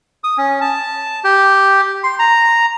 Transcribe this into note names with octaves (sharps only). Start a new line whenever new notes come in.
D#6
C#4
A5
G4
C6
A#5